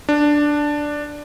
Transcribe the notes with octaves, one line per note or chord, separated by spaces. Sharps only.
D4